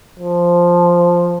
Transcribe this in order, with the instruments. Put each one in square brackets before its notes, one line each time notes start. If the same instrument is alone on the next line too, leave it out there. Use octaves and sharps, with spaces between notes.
[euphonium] F3